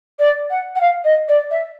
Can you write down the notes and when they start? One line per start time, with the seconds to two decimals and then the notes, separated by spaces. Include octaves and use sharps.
0.19 D5
0.50 F#5
0.75 F#5
0.80 F5
1.04 D#5
1.28 D5
1.50 E5